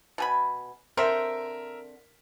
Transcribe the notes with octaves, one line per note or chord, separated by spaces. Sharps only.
B2 G#5 B5
D3 C4 A#4 C5 E5